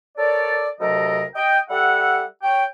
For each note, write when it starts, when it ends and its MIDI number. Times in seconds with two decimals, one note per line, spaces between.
0.17 0.68 69
0.17 0.68 70
0.17 0.68 73
0.17 0.68 74
0.80 1.23 38
0.80 1.23 48
0.80 1.23 54
0.80 1.23 69
0.80 1.23 70
0.80 1.23 75
1.35 1.59 75
1.35 1.59 79
1.70 2.24 55
1.70 2.24 67
1.70 2.24 69
1.70 2.24 76
1.70 2.24 78
2.43 2.64 73
2.43 2.64 79